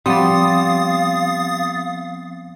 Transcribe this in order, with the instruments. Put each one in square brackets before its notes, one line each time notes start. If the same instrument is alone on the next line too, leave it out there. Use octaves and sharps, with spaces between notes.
[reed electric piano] F3 C4 C6 [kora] G3 B3 [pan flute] F5 [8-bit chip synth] D#6 A6